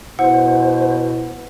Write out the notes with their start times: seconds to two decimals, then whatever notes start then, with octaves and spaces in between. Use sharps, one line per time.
0.19 B2 E4 C5 F#5